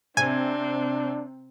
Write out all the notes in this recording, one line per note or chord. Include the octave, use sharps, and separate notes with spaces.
C3 C4 D4 G#5